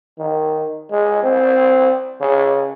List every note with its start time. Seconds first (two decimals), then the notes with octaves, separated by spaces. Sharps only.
0.18 D#3
0.91 G#3
1.23 C4
2.21 C#3